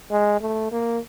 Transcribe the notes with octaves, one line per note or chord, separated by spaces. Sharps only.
G#3
A3
A#3